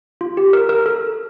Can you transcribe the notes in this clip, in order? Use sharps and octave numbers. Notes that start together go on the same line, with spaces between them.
F4
G4
A#4
A#4
A4